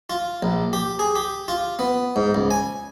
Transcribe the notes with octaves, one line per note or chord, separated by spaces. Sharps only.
F4
A#1
G4
G#4
G4
F4
B3
G#2
C#2
G#5